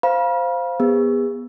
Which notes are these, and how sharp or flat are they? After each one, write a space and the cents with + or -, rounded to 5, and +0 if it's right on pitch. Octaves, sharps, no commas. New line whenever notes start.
C5 +0 F5 +0 B5 -40
B3 -10 G#4 -35